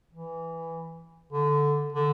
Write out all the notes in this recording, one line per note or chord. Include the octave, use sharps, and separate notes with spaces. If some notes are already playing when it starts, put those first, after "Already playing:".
E3
D3
D3